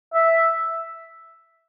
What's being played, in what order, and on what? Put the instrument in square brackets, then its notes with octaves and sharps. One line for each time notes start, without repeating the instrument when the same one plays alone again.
[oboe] E5